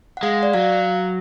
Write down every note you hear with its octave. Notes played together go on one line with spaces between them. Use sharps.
F#5
G#3 F5
D5
F#3 F5